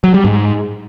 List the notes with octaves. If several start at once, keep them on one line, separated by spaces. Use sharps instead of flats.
F#3
G3
G#2